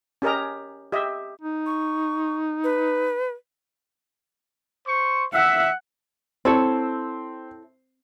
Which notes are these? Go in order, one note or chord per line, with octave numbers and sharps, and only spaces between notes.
C#4 G4 A#4 D#5 A#5
G4 D#5 E5
D#4
C#6
B4
C5 C#6
E5 F#5
C4 E4 A4 C#5